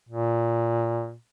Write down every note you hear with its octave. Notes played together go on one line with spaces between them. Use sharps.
A#2